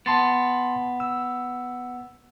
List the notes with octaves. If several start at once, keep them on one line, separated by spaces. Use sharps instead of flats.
B3 A5 C6 A6
E6